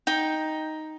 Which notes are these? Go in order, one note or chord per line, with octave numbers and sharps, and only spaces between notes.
D#4 G5